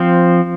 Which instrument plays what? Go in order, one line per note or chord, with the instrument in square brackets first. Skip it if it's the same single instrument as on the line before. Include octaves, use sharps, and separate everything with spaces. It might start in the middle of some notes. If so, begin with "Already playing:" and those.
Already playing: [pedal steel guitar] F3 C4